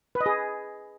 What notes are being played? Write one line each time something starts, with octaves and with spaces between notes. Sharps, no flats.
B4
D#5
G#4